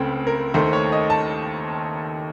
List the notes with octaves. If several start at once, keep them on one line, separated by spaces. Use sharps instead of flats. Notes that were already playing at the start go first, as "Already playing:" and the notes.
Already playing: C#2 C#3 A3 C4
A#4
D#2 D#3 A3 C5
C#5
D#5
A5